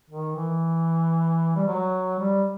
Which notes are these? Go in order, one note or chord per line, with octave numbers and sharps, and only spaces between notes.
D#3
E3
G3
F#3
G3